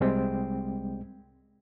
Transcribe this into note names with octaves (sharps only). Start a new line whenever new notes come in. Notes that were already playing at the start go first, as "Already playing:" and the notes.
C2 G3 G#3 C4 G5